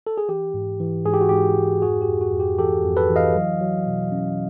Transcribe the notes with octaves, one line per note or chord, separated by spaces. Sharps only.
A4
G#4
E3 G4
G#2
E3
G#2 G#4
G4
F#4
G#2 G4
G#2
F2 F#4 G#4
G4
F2
F#4
F2
G4
E3 G4 A4
F2
A4 B4
E3
D#5 F5
F#3
F#3
B2
C#4